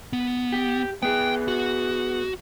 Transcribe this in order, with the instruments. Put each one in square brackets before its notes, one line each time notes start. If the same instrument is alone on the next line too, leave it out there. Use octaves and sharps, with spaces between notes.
[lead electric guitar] B3
[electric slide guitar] G4
[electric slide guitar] B3 G#4 [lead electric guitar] G5
[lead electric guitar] F#4